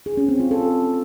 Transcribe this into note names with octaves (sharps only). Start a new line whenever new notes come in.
G#4
C#4
C4
F4
A4